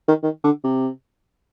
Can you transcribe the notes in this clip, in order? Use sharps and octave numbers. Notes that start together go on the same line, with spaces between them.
D#3
D#3
D3
C3